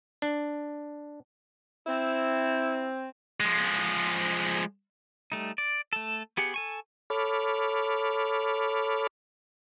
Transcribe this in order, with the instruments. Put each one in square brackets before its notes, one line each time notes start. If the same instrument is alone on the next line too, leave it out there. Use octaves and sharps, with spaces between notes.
[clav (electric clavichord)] D4
[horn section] C4 [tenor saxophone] E4
[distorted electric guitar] F3 G#3
[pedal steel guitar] G3 A3 D#4
D5
A3 A4
B3 G4 G#4 F#5
A4 G#5 C#6
[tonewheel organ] A4 C#5 B5 D6 F6